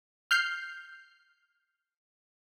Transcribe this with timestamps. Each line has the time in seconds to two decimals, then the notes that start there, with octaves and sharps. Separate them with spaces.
0.31 F6 G6 C7